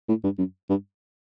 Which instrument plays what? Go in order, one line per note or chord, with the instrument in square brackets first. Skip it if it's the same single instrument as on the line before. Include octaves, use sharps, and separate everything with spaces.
[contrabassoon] A2
G2
F#2
G2